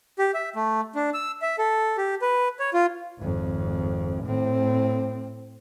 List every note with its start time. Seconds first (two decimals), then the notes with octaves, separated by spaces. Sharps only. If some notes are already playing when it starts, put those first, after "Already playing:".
0.19 G4
0.34 E5
0.56 A3
0.95 D4
1.14 E6
1.42 E5
1.58 A4
1.98 G4
2.22 B4
2.59 C#5
2.74 F4
3.19 G#1 F2
4.24 A2 C4